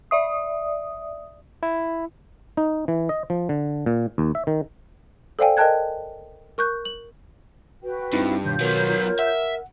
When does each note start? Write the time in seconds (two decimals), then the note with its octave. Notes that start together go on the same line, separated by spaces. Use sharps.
0.11 D5 E5 D#6
1.63 E4
2.57 D#4
2.88 E3
3.09 D#5
3.30 F3
3.49 D3
3.86 A#2
4.18 D#2
4.35 E5
4.47 D#3
5.39 A4 C5 D5 F5 G5 G#5
5.57 A#4 D#5 G5 A5 F#6 G#6
6.58 A#4 C#6 F#6 G6
6.85 F#7
7.83 F#4 B4 G5
8.13 G2 C4 D#4 E4
8.44 B2 D#3 F4 C#5 G6
8.60 F#3 B3 A#4
9.19 E5 F#5